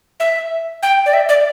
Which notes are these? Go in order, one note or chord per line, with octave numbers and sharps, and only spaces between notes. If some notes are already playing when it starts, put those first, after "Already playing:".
E5
G5
D5
E5
D5